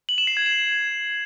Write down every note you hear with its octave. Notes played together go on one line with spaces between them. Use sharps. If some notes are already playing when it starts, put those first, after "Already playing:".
F#7
E7
C7
G#6
E7